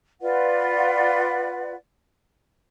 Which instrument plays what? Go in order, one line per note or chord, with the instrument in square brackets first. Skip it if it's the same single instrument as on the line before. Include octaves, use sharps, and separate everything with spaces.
[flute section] F4 B4 D5 F#5